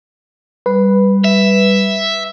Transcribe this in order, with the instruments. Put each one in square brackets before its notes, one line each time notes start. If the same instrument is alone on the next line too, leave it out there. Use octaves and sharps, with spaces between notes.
[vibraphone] G3 [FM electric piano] B4
[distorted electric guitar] E5